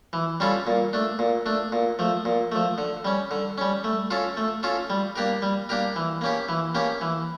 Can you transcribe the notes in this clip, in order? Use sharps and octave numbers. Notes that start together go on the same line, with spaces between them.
E3
G3 C#4 F4 A4
A#2
A3 D4
A#2
A3 D4
A#2
F3 A3
A#2
F3 A3
D3
G3 C#4
D3
G3 C#4
A3
C#4 F4 A4
A3
C#4 F4 A4
G3
A#3 D4 G4 A#4
G3
A#3 D4 G4 A#4
E3
A#3 C#4 G4
E3
A#3 C#4 G4
E3